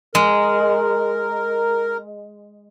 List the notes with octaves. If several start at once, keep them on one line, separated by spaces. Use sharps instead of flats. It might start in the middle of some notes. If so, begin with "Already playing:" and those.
G#3 A#4